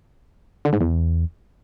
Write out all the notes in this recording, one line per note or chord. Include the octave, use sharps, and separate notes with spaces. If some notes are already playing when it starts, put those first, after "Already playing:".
D3
G#2
E2